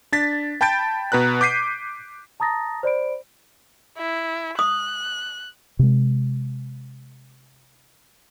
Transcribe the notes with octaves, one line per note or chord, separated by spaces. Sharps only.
D4 A6 B6
G5 A5 B5 G6 A6 D7
B2 B4 A#5 F#6
D6 G6 B6 C7 D#7
A5 A#5 D#6 A6 A#6
C5 D5 B5 D7
E4
D#6 F#6
C3 G#3